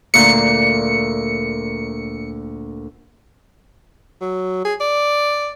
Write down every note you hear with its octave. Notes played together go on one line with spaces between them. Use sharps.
D2 A#2 A#5 C#7
F#3
G#4
D5